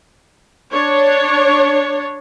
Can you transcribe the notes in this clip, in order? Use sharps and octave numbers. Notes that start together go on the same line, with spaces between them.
D4 C#5